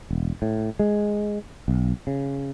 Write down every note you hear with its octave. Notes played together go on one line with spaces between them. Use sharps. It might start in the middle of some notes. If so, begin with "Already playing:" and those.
E1
A2
G#3
B1
C#3